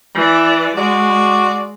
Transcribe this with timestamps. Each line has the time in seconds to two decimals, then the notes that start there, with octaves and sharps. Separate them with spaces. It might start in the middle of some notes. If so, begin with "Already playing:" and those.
0.14 E3 D5
0.76 G#3 F#4 D5